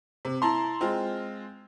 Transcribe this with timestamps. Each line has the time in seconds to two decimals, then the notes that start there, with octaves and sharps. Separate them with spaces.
0.25 C3
0.42 E4 A5 A#5 C6
0.81 G#3 C4 F4